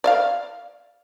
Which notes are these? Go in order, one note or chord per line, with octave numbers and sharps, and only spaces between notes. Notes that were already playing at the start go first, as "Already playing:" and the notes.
D5 E5 F5